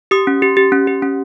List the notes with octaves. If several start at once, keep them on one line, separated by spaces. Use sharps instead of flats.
G4 D#6
C#4
G4
G4
C#4
G4
C#4